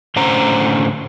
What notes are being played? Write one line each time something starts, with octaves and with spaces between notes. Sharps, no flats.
A2 D3 C#4 C5 F#5 A#5